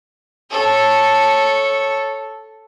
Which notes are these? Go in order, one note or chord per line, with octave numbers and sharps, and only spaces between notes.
A4 C#5